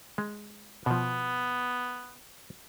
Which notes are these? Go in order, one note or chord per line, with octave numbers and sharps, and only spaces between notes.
G#3
B2 F3 B3